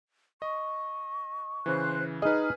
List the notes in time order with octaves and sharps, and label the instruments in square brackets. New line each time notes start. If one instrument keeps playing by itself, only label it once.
[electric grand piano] D#5 [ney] C#6
[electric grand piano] C#3 E3 [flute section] C5 F#6
[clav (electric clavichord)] D#4 D#5 [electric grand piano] G#4 B4 [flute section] F6